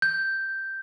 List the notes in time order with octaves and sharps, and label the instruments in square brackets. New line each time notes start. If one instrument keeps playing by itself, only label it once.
[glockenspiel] G6